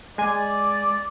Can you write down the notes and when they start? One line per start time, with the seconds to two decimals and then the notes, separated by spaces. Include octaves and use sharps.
0.18 G#3 D5 G#5